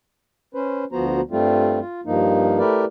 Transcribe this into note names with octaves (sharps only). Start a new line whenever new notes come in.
C#4 B4 C5
D2 F3 B3 F#4 C5 A#5
G2 G3 A3 C4 F4
F4
G2 F3 A#3 D#4
A3 E4 G4 A#4 B4 D5